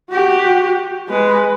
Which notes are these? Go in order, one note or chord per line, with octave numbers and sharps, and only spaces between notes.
F#4 G4
G#3 B4